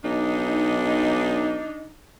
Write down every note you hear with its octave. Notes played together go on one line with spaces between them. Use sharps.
B1 D4 D#4